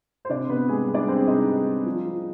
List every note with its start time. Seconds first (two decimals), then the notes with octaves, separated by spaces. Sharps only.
0.25 C5
0.29 C3 D4 D5
0.49 C3 B3 B4
0.68 G3 G#3 G#4
0.88 G3
0.94 D4 D5
1.08 G3 C4 C5
1.27 C3 D#4 D#5
1.48 G3
1.66 G3
1.86 F3
2.05 F3